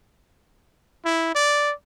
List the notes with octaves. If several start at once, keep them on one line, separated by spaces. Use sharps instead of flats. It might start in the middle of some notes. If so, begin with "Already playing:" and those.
E4
D5